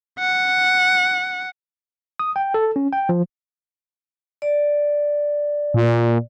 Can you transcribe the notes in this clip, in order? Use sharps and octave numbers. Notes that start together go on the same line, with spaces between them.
F#5
D#6
G5
A4
C#4
G5
F3
D5
A#2